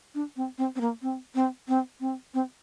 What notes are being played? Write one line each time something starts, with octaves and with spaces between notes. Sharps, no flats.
D4
C4
C4
C4
A#3
C4
C4
C4
C4
C4